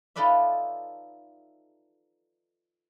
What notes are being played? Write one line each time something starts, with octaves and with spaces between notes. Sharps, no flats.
D#4 F4 A4 B4 D5 E5